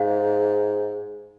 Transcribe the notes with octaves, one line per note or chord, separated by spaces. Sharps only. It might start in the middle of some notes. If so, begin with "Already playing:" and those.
Already playing: G#2 F5